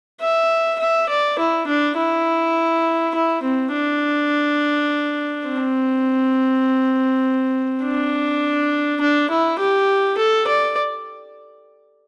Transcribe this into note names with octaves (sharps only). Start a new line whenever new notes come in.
E5
E5
D5
E4
D4
E4
E4
C4
D4
C4
D4
D4
E4
G4
A4
D5